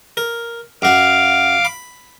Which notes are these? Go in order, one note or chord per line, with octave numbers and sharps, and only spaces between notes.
A#4
F#2 F#4 F5 D6
B5